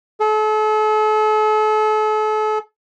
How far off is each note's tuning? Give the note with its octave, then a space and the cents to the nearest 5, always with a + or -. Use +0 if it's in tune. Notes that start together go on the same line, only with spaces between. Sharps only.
A4 -40